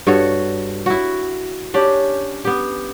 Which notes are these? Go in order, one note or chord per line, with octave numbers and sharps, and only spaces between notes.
G2 F#4 A4 C#5
E4 F#4
C#4 D4 G4
B3 G4